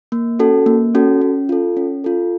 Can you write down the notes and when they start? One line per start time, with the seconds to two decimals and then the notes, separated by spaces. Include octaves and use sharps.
0.12 A#3
0.39 C#4 F#4 A4
0.66 A#3
0.95 C#4 F#4 A4
1.21 C#4
1.49 F4 A4
1.77 C#4
2.04 F4 A4